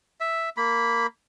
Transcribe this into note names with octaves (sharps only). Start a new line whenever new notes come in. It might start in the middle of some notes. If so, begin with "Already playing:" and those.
E5
A#3 B5